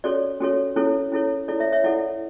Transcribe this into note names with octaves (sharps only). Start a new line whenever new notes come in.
C#4 F#4 A4 C#5 D5
C#4 F#4 A4 C#5
C#4 E4 A4 C#5
C#4 E4 A4 C#5
E4 A4 C#5 D5
C#5 E5
C#5 E5
E4 A4 C#5 D5 F#5